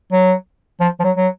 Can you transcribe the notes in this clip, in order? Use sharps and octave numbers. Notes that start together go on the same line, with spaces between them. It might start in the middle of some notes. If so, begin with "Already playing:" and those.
F#3
F3
F3
F#3
F#3